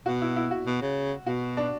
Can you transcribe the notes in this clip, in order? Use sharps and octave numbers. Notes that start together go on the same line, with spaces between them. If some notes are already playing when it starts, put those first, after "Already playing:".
B2 F#4
E4
E4
F#4
B2
C#3
B2 F#4
D4